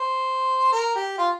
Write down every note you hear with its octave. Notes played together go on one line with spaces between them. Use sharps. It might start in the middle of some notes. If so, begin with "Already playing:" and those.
Already playing: C5
A#4
G4
F4